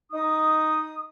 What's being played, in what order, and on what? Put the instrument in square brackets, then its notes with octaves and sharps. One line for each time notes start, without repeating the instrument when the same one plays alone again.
[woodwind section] D#4 D#6